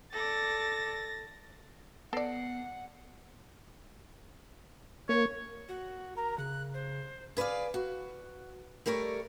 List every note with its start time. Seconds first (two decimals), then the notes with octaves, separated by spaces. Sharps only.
0.12 A4 D5 A6 A#6
2.13 B3 A4 D5 F#5 C7
5.09 A#3 C#5
5.69 F#4
6.16 A#4 A#5
6.38 C#3 F#6
6.74 C5
7.37 G#4 B4 C#5 D5 F5
7.74 F#4
8.86 G3 A3 A#4 C#5 D5